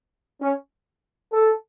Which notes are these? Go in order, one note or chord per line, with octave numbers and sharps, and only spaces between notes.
C#4
A4